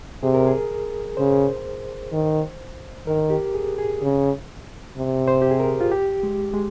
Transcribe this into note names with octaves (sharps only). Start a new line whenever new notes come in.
C3 G#4
A#4
G#4
C#3 C5
D#3
D#3 A#4
G4
G#4
G#4
C#3
C3
C5
G4
G#4
A#4
F4
G4
G#3
G#3